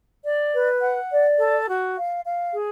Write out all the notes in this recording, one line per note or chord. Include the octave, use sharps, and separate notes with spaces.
D5
B4
F#5
D5
A4
F#4
F5
F5
G#4